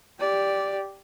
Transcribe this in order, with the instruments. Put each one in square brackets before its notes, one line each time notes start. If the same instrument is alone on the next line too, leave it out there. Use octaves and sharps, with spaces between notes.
[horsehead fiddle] G4 D5